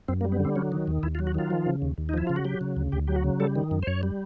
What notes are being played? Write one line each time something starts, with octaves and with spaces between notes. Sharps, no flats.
F#2 C4
A#3
G3
B3
D3 C4
F#3 C#4
D#3
D#2
D#2 E4
F4
F#3
F#4
D#3 F4
F3
C#3
D#2
D#2
D#4
F3 E4
C#3 F4
F#4
F#3 G4
C#3
D2
D2 G4
F#3 G4
F#4
C#3
G3 A4
D#3
F#2
C5
F#2 C#5
G3